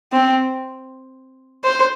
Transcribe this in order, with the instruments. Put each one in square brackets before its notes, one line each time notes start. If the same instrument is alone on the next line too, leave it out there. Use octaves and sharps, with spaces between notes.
[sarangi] C4
C5